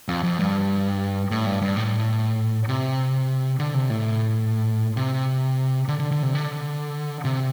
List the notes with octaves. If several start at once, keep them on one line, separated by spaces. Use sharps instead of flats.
F2
F2
G2
A2
G2
G2
A2
C3
D3
C3
A2
C3
D3
D3
D3
C3
D3
C3